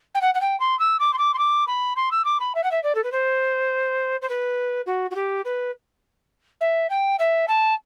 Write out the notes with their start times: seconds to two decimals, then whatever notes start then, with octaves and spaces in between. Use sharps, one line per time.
0.14 G5
0.21 F#5
0.34 F#5
0.41 G5
0.60 C6
0.79 E6
0.99 D6
1.13 C6
1.18 D6
1.33 C6
1.38 D6
1.67 B5
1.96 C6
2.11 E6
2.24 D6
2.39 B5
2.55 E5
2.63 F#5
2.71 E5
2.83 D5
2.95 A4
3.03 B4
3.12 C5
4.22 C5
4.29 B4
4.86 F#4
5.10 F#4
5.15 G4
5.45 B4
6.60 E5
6.89 G5
7.19 E5
7.48 A5